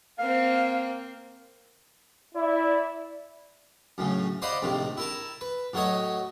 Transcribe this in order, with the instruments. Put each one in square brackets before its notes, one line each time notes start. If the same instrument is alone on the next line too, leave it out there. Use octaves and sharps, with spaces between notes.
[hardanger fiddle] A#3 C4 [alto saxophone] F5
[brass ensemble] E4 D5
[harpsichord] F#2 A2 C#3
C5 D5 D#5 F5 F#5 B5
A#1 A2 C3 D#3
E4 A#4 A5
B4
A2 F#3 A3 C#5 D#5